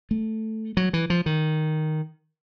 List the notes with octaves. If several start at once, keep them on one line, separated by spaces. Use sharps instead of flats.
A3
F#3
E3
F3
D#3